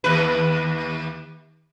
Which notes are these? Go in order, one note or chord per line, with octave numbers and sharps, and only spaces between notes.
D#2 B4